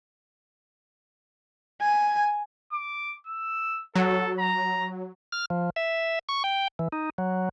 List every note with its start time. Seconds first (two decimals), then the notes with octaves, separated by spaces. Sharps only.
1.81 G#5
2.72 D6
3.27 E6
3.96 F#3 A4
4.39 A#5
5.32 F6
5.50 F3
5.76 E5
6.29 C#6
6.44 G5
6.79 E3
6.92 D#4
7.18 F#3